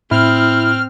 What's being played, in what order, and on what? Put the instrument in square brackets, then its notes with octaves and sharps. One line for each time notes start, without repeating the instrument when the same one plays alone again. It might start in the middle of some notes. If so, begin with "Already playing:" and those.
[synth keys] A2 [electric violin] C4 [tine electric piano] E4 [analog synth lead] F6